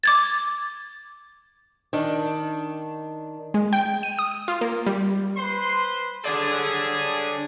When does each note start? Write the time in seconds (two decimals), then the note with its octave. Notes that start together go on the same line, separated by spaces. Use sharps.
0.04 D6 G#6 A6
1.93 D#3 D4
3.54 G#3
3.73 G5
4.03 D#7
4.19 D#6
4.48 F4
4.61 A#3
4.87 G3
5.37 B4 C5 C6
6.25 F#3 G3 D4 G#4 A4 D5